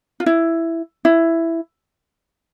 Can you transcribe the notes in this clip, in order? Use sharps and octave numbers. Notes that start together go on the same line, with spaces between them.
F4
E4
E4